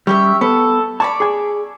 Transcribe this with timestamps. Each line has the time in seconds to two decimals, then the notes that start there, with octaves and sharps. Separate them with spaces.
0.07 G3 C#4 G4 E5
0.41 B3 A4
1.00 C#5 D5 A5 B5
1.20 G#4 G#5